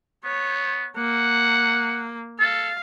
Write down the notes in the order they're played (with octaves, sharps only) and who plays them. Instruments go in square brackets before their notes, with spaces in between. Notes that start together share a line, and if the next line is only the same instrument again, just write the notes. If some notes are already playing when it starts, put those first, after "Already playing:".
[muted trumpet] B3 [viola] C#5
[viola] A#3 [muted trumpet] F#5
[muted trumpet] A4 [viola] F5